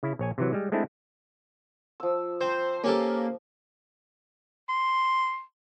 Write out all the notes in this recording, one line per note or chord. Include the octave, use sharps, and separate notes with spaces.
C#3 E4
A#1 C#5 G#5
C3 E3 F#3
G3 G#3
G#3 A3 C4 D4 E4
F3 E6
C4 C5
A#3 C#4 G4 A4
C6